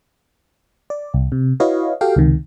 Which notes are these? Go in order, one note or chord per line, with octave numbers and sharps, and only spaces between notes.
D5
C2
C3
E4 F#4 B4 C#5 D#5 F5
F#4 G4 A4 F5 G5
C#2 C3 D#3